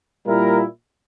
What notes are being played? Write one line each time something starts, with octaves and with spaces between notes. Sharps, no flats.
A#2 G3 A#3 E4 A#4